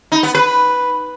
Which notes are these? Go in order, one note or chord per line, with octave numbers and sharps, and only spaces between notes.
D#4
B3
B4